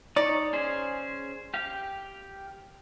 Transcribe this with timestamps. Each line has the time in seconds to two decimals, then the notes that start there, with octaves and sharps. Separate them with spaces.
0.16 D#4 C#5 D5
0.53 C#4 G#4 C5
1.54 G4 F5